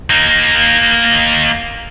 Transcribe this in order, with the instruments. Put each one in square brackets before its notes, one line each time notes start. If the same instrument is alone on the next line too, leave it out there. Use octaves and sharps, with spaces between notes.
[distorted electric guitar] A#3 D#4